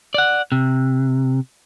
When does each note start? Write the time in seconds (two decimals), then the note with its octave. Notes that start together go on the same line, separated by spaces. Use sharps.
0.14 D5 F#5
0.52 C3